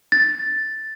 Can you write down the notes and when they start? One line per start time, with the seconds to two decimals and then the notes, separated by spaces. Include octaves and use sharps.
0.12 A6